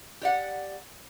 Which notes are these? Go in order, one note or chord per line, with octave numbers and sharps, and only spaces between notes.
G4 D5 F#5